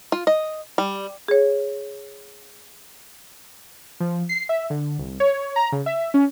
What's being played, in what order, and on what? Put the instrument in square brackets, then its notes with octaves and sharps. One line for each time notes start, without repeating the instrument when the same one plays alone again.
[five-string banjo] F4
D#5
G3
[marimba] G#4 C#5
[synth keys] F3
C7
E5
D3
C2
C#5
A#5
C#3
E5
C#4